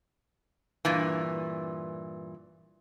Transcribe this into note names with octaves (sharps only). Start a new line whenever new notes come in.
G2 A#2 E3